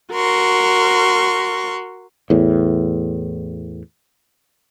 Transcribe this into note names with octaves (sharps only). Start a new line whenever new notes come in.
F#4 A#4 C6 C#6
E2 A2